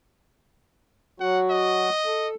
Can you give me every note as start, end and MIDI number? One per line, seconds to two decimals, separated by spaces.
1.20 1.89 54
1.20 1.89 66
1.20 1.41 78
1.50 2.28 75
2.06 2.35 69